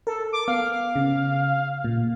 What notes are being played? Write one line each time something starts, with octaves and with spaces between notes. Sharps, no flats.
A4 A#4
D6
B3 F5
C#3
A#2